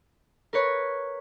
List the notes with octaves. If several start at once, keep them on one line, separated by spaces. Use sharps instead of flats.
A#4 B4 C#5